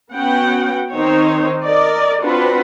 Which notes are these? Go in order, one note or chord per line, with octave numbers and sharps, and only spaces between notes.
B3 C#4 F#4 F#5 G5
D#3 C4 D#4 C5 C#5
A#4 D5 D#5
C4 D4 F4 F#4 B4 F#5